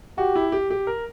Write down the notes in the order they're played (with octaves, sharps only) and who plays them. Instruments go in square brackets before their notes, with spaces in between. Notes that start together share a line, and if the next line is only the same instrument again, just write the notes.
[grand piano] F#4 [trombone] G4
[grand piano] E4
G4
G4
A#4